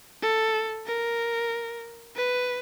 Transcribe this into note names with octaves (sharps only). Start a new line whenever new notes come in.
A4
A#4
B4